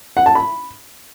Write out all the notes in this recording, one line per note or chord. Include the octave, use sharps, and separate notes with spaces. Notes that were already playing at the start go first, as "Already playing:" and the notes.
F#5
A5
B5